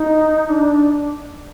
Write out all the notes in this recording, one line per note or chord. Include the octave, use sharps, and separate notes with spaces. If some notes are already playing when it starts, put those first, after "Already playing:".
Already playing: D#4
D4